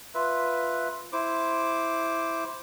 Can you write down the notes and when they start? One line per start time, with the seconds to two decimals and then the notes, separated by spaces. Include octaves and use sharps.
0.15 F4 B4 E5
1.13 E4 C5 D6